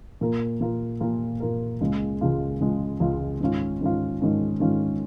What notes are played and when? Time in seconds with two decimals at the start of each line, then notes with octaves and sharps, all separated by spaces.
0.21 A#2 A#3 F4 A#4
0.60 A#2 A#3 F4 A#4
1.00 A#2 A#3 F4 A#4
1.40 A#2 A#3 F4 A#4
1.81 C#2 C#3 G#3 F4
2.21 C#2 C#3 G#3 F4
2.60 C#2 C#3 G#3 F4
3.00 C#2 C#3 G#3 F4
3.41 G#2 D#3 C#4 F4
3.81 G#2 D#3 C#4 F4
4.21 G#2 D#3 C#4 F4
4.60 G#2 D#3 C#4 F4